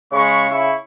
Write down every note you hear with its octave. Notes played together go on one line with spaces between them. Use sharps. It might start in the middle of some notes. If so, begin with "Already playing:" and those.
C#3 G#3 B5 C#6
E4 C#6